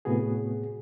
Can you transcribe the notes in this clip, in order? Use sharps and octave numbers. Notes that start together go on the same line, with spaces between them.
A2 C3 B3 F#4 G#4